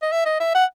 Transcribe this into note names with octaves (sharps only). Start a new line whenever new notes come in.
D#5
E5
D#5
E5
F#5